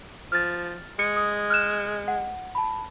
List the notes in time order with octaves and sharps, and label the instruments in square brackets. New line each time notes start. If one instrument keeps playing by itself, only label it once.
[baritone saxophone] F3 [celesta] F6 A6
[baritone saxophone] G#3 [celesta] C#7
[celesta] D#6
F6 F#6 E7
F#5
A5 B5